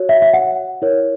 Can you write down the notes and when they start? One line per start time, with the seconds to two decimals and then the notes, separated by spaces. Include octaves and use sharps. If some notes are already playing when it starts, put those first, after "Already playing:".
Already playing: F#4 C#5
0.09 E5
0.22 E5
0.33 F#5
0.82 E4 A#4 C#5